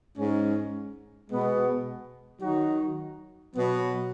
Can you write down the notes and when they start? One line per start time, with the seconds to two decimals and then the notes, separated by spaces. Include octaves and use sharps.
0.17 G#2 G#3 C#4
1.30 B2 G#3 B3
2.42 D#3 F#3 D#4 F#4
3.55 B2 F#3 B3